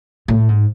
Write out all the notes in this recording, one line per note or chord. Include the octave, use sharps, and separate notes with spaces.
A2
G#2